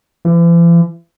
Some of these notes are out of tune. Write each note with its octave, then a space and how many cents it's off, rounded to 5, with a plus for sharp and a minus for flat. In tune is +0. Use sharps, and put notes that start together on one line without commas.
E3 +45